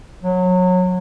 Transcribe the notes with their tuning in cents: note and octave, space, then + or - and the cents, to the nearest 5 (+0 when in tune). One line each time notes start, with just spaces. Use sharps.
F#3 -25